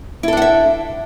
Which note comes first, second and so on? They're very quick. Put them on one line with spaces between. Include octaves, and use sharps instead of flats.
E4 A4 D4 F#5 E5